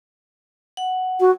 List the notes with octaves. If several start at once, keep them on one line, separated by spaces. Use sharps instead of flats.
F#5
F#4